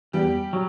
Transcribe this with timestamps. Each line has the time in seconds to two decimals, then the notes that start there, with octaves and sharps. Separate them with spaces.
0.13 E2 G3 G4
0.53 F#3